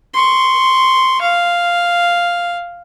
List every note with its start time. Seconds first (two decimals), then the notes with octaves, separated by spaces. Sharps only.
0.13 C6 C#6
1.21 F5